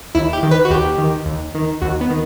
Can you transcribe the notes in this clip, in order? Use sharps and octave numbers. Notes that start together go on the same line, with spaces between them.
D#2 E4
G4
D#3
B4
F#4
D#2 G4
D#3
D#2
D#3
D#2 F#4
B3
D#3